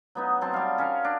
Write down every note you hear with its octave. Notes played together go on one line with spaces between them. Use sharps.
F#3 B3 D#4
F#3 C4 A5
G3 F5
C#4 A#4 F5
D4